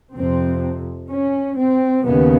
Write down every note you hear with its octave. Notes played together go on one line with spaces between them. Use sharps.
F2 C3 C4
C#4
C4
D#2 C#3 B3